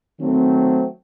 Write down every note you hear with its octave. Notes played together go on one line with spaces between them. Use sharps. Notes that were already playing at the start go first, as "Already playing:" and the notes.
D#3 F#3 A3 C4